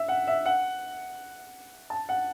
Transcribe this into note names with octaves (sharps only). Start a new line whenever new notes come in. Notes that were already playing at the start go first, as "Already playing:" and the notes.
Already playing: E5
F#5
E5
F#5
A5
F#5